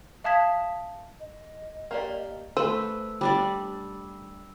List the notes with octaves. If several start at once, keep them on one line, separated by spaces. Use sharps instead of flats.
E5 F5 A5 D#6 G#6 B6
D#5
A#3 G4 D5
A3 B4 C5 E6
G3 D4 D5